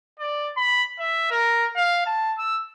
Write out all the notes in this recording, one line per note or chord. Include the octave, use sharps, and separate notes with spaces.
D5
B5
E5
A#4
F5
A5
E6